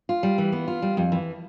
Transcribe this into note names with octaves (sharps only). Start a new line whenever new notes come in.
F4
G3
E3
B3
F4
G3
F2
E3